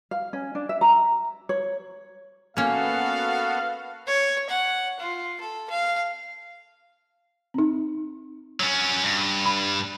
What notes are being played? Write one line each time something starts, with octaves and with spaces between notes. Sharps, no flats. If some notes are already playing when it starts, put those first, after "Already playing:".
F5
C#4
D4
E5
A#5
C#5
A#3 B3 C#4 F#4 A4 F5
C#5
F#5
F4
A4
F5
C4 D#4
F#3 C#4
G2
B5